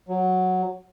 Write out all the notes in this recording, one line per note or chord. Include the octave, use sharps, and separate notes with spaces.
F#3